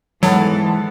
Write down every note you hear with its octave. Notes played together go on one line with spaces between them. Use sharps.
G#2 E3 F#3 B3 A4 A5